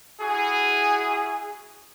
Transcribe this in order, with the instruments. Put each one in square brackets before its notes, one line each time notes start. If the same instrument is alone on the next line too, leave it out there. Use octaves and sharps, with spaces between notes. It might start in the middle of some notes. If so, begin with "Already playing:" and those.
[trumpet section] E4 F#4 G#4